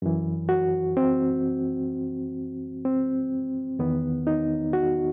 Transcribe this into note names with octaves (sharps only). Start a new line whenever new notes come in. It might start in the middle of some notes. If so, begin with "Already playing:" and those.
F#2 E3
F#4
C4
C4
E2 D#3 B3
D#4
F#4